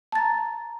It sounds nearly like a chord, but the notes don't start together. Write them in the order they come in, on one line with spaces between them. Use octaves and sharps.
A5 A6 A#5